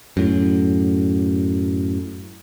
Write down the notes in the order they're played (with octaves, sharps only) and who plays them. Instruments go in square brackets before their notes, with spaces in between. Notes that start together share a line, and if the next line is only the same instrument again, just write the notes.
[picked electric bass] F#2 A2